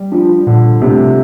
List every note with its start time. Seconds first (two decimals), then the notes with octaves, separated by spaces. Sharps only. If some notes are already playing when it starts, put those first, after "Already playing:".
Already playing: G3
0.12 F3 D4 F4
0.47 A#2 D3
0.82 C3 A3 D4 G4